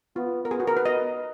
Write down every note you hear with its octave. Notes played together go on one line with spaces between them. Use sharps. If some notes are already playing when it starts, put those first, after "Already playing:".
B3 F4
A#4
B3 G#4
F#4
A#4
B4
D#5